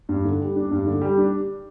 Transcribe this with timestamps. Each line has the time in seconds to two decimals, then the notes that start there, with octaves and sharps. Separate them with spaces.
0.09 G2
0.25 D3
0.41 G3
0.56 D4
0.71 G2
0.86 D3
1.01 G3
1.18 D4